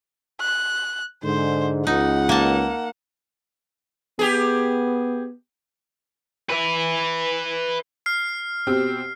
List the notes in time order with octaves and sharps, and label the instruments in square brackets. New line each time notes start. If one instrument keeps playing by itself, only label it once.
[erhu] F#6
[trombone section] G#2 D3 [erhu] C5
[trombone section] C#2 [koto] D#4 [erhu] F#5
[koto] A#3 A5
[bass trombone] B3 [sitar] G4 G#4
[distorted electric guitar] B4 E5
[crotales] F6 C7
[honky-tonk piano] B2 C4 G4